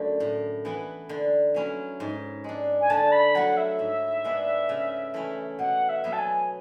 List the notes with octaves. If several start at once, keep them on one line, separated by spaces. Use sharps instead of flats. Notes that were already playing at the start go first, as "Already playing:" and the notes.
Already playing: F#2 D3 A3
A2
E3 B3 E4
D3
F#3 C#4 E4
G#2
G#3 D4
G#5
D3 A5
B5
F#3 A3 E4 F#5
E5
G#2
G#3 B3 D4
C#3
E3 A3 C#4 E4
B2 F#5
E5
F#3 B3
A5
G#5